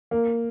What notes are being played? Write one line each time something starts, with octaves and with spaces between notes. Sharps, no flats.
A#3